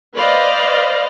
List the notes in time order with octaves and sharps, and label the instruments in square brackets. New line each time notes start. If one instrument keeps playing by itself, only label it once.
[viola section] B4 C5 D5 D#5 F5